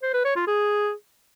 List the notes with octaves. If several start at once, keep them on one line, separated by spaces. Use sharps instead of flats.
C5
B4
C#5
F4
G#4